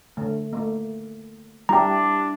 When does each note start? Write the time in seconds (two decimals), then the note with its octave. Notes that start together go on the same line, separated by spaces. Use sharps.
0.17 D3 A3
0.53 A3 A#3
1.69 G3 D4 E4 G4 G5 A#5